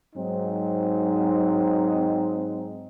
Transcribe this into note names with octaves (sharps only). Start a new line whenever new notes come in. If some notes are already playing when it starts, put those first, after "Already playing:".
G#2 F#3 C4 D#4